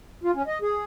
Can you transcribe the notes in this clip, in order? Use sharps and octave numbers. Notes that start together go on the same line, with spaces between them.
F4
C#4
D#5
G#4